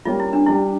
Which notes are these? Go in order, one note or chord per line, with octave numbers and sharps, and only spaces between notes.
G3 A#3 C#4 F4 G4
E4
D4
G3 D4 E4 G4